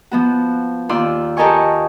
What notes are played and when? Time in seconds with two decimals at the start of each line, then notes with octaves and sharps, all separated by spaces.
0.11 F3 B3 F#4
0.89 D#2 F4 D5 C6 E6
1.37 G4 A4 A#4 D#5 G#5 C#6